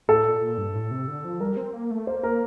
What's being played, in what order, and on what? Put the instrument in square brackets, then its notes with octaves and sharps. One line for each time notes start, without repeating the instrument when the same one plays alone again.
[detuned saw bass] A2 [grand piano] A4
[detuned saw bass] A#2
A#2
G2
A2
C3
D3
F3
[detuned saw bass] G3 [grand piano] A#4
[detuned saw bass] C4
A#3
A3
[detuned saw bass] A#3 [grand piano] C5
[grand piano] A#4